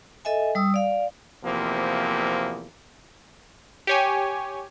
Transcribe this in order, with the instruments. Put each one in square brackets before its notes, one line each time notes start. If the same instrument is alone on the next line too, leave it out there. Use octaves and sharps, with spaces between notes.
[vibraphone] A4 D#5 E5 G#5
G3 D#6 E6
D5 F5
[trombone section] E2 C3 F3 A#3
[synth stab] G4 C#5 G#5